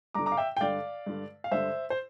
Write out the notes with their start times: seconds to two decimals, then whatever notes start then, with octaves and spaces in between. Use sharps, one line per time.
0.14 G2 A#5 D6
0.19 D3
0.26 A#5 D6
0.32 F5
0.37 E5 G5
0.57 G5
0.61 G2 D3 D5 F5
1.06 G2 D3
1.44 F5
1.51 G2 D3 C5 E5
1.90 C5